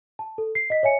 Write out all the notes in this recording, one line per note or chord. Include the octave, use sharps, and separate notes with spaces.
A5
A4
C7
D#5 B6
C#5 E5 G#5 C#7